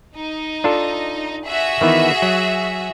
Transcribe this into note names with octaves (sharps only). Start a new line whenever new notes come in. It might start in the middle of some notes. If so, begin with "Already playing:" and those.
D#4
D4 F4 A4
F#4 G#4 E5
D#3 E3 B3
F#3